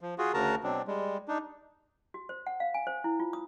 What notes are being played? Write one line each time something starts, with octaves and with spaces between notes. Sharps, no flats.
F3
F4 F#4 G#4
D2 C#3 F#4 A#4 A5 A#5
B2 F#3 C4 D4
G3 G#3
D4 D#4
F#4
C5
F#5
F5
G#5
C5
E4
F4
D#6